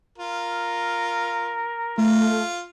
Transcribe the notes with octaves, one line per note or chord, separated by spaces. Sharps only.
F4 A#4
A3 F4